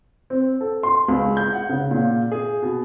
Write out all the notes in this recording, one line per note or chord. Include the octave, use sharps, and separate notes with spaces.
C4
A4
C6
C#2
G6
F#5
C#3
A#2
G#4
B2